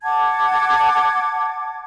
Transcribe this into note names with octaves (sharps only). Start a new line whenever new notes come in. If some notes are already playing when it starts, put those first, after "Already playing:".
F#5 A5 D6 G#6